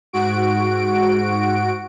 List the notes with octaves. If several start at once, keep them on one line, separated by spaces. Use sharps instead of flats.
G#2 F#4 D7